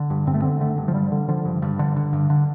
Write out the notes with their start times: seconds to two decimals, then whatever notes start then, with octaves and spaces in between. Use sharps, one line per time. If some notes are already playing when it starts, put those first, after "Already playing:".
Already playing: D3
0.10 G2
0.27 G2 C4
0.34 A3
0.42 D3 C4
0.61 D3 A3
0.78 G2
0.88 F3
0.94 G2 G3
1.12 D3
1.28 D3 F3
1.45 G2
1.62 G2
1.79 D3
1.96 D3
2.13 G2
2.30 D3